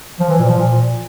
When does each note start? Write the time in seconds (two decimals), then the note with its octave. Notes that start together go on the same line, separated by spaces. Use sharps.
0.20 F3
0.29 E3
0.39 A#2
0.49 F3
0.58 A#2